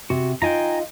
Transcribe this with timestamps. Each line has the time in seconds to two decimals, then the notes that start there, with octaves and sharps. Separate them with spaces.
0.10 C3 F#4
0.42 D#4 F4 G5 G#5 A#5